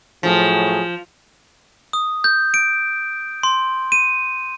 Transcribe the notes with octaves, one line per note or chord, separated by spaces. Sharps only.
A2 F3 F#3 G#4
D#6
G6
D7
C6
D#7